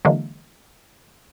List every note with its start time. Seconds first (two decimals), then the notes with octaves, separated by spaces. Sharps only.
0.05 D3 E3 F#3 G#3 A#3